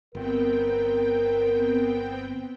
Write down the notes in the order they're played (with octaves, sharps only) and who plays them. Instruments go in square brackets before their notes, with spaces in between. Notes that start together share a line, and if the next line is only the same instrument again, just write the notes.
[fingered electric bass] G1 [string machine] B3 C4 G5 [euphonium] A#4